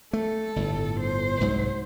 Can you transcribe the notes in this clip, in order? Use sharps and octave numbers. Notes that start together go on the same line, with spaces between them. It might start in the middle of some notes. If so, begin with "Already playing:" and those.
A3 A4
G1 A2
C5
C2 G#2 F#3